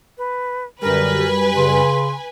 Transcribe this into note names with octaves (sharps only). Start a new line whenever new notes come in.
B4
F#2 D3 G3 A#4 B4 G#5
C#3 C6